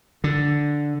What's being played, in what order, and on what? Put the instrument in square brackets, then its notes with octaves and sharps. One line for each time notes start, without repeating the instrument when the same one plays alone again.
[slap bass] D3